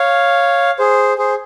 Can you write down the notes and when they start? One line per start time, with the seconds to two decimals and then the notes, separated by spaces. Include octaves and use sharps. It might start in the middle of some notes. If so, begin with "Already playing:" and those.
Already playing: C#5 F5
0.79 G#4 C5
1.18 G#4 C5